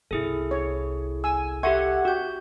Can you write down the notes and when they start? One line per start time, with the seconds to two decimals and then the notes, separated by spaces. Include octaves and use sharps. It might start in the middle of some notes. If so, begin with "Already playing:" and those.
0.11 G1 C2 E4 G#4 A4
0.51 C#5
1.24 G#5 E6
1.63 G4 A4 E5 F#5 C6 C#6 G#6
2.05 F#4 G4 G6